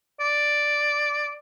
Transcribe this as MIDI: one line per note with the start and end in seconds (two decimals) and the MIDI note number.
0.20 1.36 74